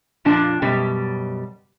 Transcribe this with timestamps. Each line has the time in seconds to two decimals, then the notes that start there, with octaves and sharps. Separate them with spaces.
0.25 F2 A#2 F3 D4 A5
0.62 F#2 B2 G3